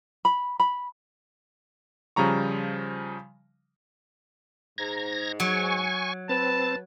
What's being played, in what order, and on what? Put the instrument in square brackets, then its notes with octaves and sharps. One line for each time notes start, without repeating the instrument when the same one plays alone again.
[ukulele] B5
B5
[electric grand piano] C#3 F3 G3 A#5 C#6
[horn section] G#2 [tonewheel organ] A#5 G#6 A#6
[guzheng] F#3 [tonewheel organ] G#5 C#6
[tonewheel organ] C4 A6 [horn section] B4 [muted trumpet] A5